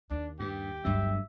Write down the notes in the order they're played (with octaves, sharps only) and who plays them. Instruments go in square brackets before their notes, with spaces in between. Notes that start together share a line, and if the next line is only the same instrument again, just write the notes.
[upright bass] D#2 [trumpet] D4
[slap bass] G2 [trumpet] G4
[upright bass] G1 D2 [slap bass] G2 F#3 [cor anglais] E5